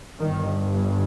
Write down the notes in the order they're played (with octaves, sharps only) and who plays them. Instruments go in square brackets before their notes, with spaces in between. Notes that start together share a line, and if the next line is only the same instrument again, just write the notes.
[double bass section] G1 G2 D#3